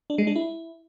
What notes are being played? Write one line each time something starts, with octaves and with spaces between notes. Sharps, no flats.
D4
G#3
D4
E4